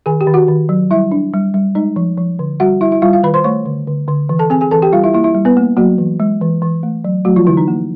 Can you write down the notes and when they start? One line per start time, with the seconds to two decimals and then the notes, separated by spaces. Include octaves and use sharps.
0.06 D#3 G#4 G#5
0.20 G4 G5
0.27 D#3
0.34 F#4 F#5
0.48 D#3
0.69 F#3
0.91 G3 E4 E5
1.12 D4
1.33 G3
1.54 G3
1.75 G#3 D#4 D#5
1.96 F3
2.18 F3
2.39 D3
2.60 G3 F#4 F#5
2.81 G3 E4 E5
2.92 E4 E5
3.02 G3 F4 F5
3.13 F4 F5
3.23 D#3 B4 B5
3.34 C5 C6
3.44 A3 C#5 C#6
3.65 D3
3.87 D3
4.08 D3
4.29 E3
4.39 A4 A5
4.50 C4 G#4 G#5
4.61 G#4 G#5
4.71 E3 A4 A5
4.82 G4 G5
4.93 G3 F4 F5
5.04 E4 E5
5.14 A#3 E4 E5
5.24 E4 E5
5.34 G3
5.45 B3 B4
5.57 A#3
5.77 F#3 A#3 F#4
5.98 E3
6.20 G#3
6.41 E3
6.62 E3
6.83 A3
7.05 F#3
7.25 F#3 A3 F#4
7.36 F3 F4
7.47 D3 E3 E4
7.57 D#4
7.68 A#3